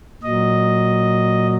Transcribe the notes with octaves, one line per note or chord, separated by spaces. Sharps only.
A#2 F#3 D#5